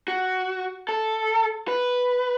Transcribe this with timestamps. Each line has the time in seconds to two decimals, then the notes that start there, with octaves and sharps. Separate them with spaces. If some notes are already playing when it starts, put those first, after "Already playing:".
0.08 F#4
0.89 A4
1.68 B4